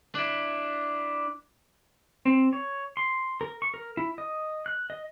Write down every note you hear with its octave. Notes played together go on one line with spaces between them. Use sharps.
D4 E4
C4
C#5
C6
A#4
C#6
A#4
E4
D#5
F#6
D#5